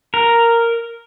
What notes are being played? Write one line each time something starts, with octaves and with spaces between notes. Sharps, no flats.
A#4